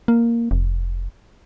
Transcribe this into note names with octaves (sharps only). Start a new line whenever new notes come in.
A#3
F1